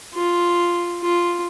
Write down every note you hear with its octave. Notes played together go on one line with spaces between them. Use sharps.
F4
F4